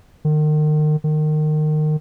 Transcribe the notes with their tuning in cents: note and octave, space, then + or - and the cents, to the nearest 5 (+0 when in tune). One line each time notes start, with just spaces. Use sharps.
D#3 -35
D#3 -25